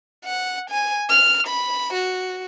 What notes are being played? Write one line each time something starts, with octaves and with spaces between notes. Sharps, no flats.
F#5
G#5
F6
B5
F#4